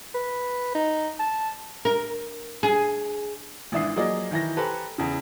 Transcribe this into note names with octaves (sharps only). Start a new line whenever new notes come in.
B4
D#4
A5
A#4
G#4
G#1 E3 D4 E5 D#6 C7
F3 F#3 A#3 G#4 D5 D#5
D#3 E3 A#6
G4 A4 B4 C5 G#5 A#5
E2 C#3